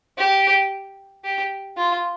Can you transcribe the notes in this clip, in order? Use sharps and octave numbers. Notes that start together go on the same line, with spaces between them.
G4
G4
F4